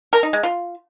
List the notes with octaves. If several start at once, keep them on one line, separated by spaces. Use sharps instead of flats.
A#4
D#4
G#3
F4